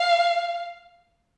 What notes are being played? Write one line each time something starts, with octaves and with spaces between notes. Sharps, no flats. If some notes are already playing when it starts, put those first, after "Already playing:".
Already playing: F5